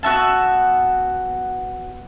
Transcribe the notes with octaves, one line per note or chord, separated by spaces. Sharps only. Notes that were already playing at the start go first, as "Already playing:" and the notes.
B3 F#4 E5 A5